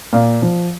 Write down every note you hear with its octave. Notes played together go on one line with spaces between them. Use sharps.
A#2 F5
F3